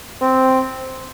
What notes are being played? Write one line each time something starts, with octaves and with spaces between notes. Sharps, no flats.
C4